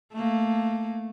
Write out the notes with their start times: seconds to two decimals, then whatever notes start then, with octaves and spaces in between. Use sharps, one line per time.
0.13 A3 A#3